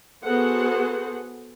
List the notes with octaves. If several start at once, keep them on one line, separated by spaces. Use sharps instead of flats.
B3 F#4 G#4 A4 C5 F#5